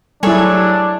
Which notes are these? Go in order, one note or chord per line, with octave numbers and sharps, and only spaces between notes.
F#3 G3 D4 E4 G#4 A4 C#5